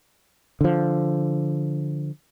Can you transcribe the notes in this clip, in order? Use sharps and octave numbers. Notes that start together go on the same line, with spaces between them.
D3 F3